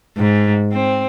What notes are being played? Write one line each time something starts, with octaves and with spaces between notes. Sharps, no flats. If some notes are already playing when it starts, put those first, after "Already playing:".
G#2
C4